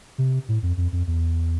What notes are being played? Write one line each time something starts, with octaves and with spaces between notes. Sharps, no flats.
C3
A2
F2
F2
F2
E2